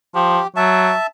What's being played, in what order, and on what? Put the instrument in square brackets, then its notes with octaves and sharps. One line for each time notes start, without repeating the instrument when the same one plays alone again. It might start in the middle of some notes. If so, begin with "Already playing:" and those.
[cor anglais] F3 [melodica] G4
[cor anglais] F#3 [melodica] E5 A5